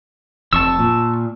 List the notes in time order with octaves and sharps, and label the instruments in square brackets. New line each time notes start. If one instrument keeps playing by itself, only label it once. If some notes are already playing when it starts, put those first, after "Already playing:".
[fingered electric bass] F1 F2 [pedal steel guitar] A5 C#6 E6
[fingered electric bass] A#2